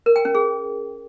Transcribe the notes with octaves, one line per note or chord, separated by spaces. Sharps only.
A#4
G5
C#4
G#4